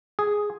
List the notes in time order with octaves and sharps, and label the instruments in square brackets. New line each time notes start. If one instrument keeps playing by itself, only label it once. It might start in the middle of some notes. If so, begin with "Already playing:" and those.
[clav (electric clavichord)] G#4